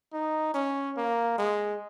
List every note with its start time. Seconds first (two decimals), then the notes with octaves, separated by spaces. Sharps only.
0.13 D#4
0.54 C#4
0.97 A#3
1.38 G#3